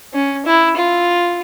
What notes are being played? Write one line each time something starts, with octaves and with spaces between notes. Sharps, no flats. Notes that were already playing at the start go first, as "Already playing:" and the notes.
C#4
E4
F4